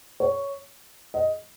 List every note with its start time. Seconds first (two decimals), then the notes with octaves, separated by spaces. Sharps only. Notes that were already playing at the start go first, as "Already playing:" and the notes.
0.20 C#5
1.14 D#5